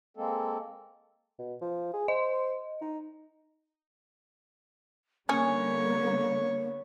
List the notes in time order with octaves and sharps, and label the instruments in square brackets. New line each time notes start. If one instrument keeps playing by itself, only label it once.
[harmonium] G#3 A#3 C4 A4
[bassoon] B2
F3
G#4
[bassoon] C5 [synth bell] D#5
[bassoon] D#4
[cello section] D3 G3 B3 [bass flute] A#3 [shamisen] C#4 G#4 [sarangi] C#5